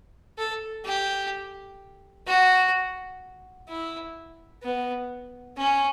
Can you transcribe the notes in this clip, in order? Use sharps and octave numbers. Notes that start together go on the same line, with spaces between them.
A4
G4
F#4
E4
B3
C#4